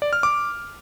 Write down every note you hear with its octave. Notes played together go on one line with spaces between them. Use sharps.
D5
F6
D6